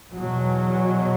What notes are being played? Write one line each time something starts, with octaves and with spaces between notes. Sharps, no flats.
E2 B2 F#3